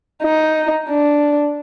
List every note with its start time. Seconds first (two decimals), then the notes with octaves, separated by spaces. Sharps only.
0.22 D#4
0.89 D4